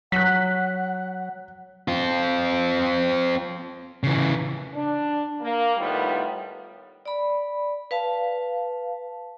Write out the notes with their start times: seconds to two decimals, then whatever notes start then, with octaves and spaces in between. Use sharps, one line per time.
0.12 F#3 F#5 F#6 B6
1.88 C4 F4
4.03 C#3 E3
4.74 D4
5.41 A#3
5.77 A2 D#3 G3 B3 F4
7.06 D5 B5
7.91 B4 F5 A5